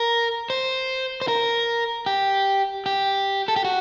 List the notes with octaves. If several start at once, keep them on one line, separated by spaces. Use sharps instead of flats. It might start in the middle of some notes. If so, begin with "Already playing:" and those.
Already playing: A#4
C5
C5
A#4
G4
G4
A4
G4
F#4